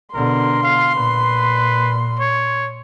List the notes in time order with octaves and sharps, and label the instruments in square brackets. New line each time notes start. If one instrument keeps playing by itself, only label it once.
[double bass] B2 D3 [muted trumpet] A#4 [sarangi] C6
[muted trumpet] F5
[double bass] A#2 [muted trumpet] B4
[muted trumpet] C#5